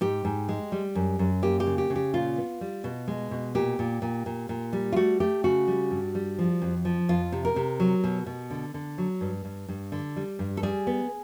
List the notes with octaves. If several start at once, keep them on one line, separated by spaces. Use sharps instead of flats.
G#2 G4
G#2
G#3
G3
F#2
F#2
A#3 G4
G4
C#3
G4
C#3
G4
A#2 F4
B3
G3
B2
G#3
B2
A#2 G4
A#2
A#2
A#2
A#2
G3
F4
A3 F#4
A3 G4
C#3 F#4
G3
G2
G3
F3
F2
F3
F2 F4
C3
A#4
C3
F#3
B2
B2
D3
D3
F#3
G2
G2
G2
D3
G3
G2
A4
G3 G#4
B3